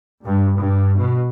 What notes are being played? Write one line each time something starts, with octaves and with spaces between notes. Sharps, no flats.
G2
G2
B2